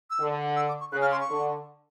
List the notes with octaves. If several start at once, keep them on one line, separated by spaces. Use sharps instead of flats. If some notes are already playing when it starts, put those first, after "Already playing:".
E6
D3
E6
D6
C#6
C#3 F#6
F6
C6
C#6
D3